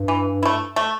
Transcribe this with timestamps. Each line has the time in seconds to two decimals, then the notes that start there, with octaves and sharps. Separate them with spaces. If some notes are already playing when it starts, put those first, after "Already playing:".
Already playing: G2
0.08 E3
0.43 A3 E4
0.76 A3